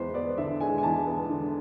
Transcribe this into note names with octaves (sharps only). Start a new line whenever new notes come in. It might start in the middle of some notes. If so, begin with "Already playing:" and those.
Already playing: E2 G#3 B4 C5
B3 D5
D3 E5
G#3 G#5
G#5
E2 A5
B3
D3